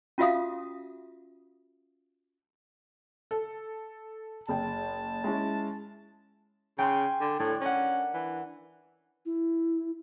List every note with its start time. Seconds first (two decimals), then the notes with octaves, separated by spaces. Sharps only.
0.18 C#4 F4 F#4 E5 F5 D#6
3.31 A4
4.49 F#1 G#4 G5 A5
5.24 G#3 C#4 E4
6.79 C#3 G5 G#5 C6
7.21 D3
7.40 A2 D4
7.61 C#4 A#4 F#5
8.14 E3
9.25 E4